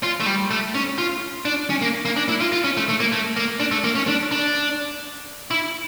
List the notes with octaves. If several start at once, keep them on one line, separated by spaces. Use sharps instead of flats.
F4
A3
G3
A3
C#4
F4
D4
C#4
A#3
A#3
D4
E4
F4
F4
C#4
A3
A3
A#3
A3
A#3
D4
A3
A#3
C#4
D4
D4
E4